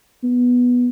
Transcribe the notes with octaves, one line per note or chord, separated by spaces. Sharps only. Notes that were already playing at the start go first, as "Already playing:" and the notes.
B3